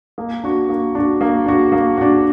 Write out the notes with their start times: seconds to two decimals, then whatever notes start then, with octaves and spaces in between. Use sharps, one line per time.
0.18 A#3
0.43 D4 F#4
0.69 A#3
0.95 D4 F#4
1.21 A#3
1.46 D4 F#4
1.72 A#3
1.98 D4 F#4